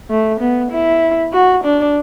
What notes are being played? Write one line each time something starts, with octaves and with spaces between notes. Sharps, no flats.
A3
B3
E4
F#4
D4